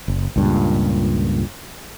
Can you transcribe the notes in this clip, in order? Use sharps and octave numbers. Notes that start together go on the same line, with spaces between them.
F#1
C#2 G2 A#2